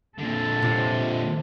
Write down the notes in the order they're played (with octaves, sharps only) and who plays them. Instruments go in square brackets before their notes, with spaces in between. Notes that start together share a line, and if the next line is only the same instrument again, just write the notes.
[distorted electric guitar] A#2 D3 [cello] A4
[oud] C3 F4